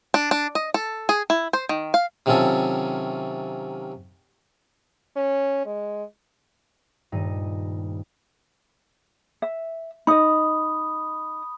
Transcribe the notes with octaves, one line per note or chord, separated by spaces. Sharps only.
D4
D4
D#5
A4
G#4
E4
C5
D#3
F5
C3 D#3 F#3 C#4 F4 A4
C#4
G#3
D#1 G2 A3 D#4 D#7
E5
D#4 D#5 B5 D#6